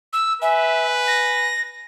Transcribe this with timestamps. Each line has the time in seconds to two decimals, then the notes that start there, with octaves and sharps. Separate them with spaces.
0.13 E6
0.42 B4 E5 G#5
1.08 A#6